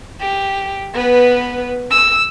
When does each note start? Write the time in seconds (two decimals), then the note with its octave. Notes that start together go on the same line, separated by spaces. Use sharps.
0.21 G4
0.94 B3 B4
1.91 E6